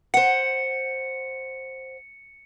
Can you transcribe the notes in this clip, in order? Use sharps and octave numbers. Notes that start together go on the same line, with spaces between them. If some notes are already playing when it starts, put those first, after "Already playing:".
C5 F#5 C#7